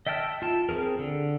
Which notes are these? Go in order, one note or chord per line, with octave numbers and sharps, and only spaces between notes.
D#5 E5 G5 A5 F6
F4 A5
C4 C#4 G#4 A#4
D3